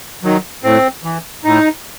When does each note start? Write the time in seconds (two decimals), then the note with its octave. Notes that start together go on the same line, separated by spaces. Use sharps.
0.23 D#3 F#3
0.63 A2 C4
1.04 E3
1.44 A2 D#4